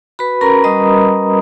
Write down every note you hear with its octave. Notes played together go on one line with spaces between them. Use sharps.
F#4 B4 B5
C#4 A#4 A#5
G3 D#5 D#6